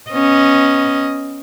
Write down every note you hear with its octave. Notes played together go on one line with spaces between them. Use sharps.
B3 C#4 D#5